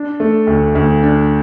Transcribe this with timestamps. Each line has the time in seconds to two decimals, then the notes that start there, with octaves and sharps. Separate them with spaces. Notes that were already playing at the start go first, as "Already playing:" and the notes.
Already playing: D4
0.20 A3
0.47 D2
0.75 D2
1.03 D4